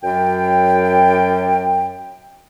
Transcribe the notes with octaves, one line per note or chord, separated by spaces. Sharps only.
F#2 G5